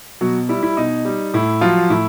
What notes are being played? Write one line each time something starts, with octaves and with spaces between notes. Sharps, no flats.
B2 F#3 F#4
G3 E4
E4
B2 D#4
G3
A2 E4
F3 F#3 F4
A2 E4